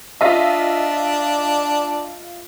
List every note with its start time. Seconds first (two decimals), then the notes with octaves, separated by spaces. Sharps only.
0.21 D4 F4 D#5 E5